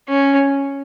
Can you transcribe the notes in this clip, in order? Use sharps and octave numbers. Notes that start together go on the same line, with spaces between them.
C#4